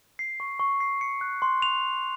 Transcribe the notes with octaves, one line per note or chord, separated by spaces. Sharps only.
C7
C#6
C#6
C7
C#7
F#6
C6
F7